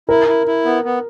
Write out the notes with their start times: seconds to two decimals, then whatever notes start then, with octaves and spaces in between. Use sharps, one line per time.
0.09 E4 A#4
0.28 E4
0.47 E4
0.65 B3
0.84 B3